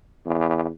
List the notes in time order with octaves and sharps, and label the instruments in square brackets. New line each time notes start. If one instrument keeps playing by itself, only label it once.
[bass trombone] E2